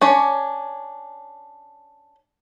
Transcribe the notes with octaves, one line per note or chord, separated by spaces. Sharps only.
C#4 D4 C#5